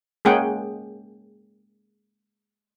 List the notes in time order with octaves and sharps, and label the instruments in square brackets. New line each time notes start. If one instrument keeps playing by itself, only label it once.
[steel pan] G#3 A#3 C#4 G#4 F#5 G5